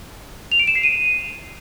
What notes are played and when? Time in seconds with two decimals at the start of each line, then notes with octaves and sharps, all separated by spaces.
0.52 F7
0.59 D7
0.67 E7
0.75 C7
0.83 D#7